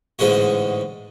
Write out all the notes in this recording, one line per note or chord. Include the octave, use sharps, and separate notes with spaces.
A1 G#2 D3 G#3 F#4